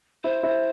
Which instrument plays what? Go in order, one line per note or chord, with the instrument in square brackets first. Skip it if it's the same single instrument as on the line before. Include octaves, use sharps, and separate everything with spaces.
[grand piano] E4 [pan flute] C5
[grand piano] E4